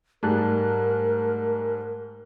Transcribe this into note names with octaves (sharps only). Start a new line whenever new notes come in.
G#2 G3 A3 G#4 A#4 A5 F#6